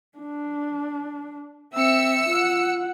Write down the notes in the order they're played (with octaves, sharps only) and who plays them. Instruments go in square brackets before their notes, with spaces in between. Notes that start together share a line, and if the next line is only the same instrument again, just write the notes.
[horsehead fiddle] D4
[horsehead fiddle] C4 E5 [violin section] E6 C#7
[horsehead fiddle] F4 F#5